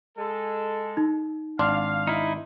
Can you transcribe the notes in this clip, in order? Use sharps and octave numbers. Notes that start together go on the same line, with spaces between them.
G#3 A4
D#4
G#1 D4 F5 C6
D#4 E4